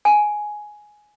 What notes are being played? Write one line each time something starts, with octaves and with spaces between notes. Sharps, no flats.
G#5